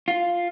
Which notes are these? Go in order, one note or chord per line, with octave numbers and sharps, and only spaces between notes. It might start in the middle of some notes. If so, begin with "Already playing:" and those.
F4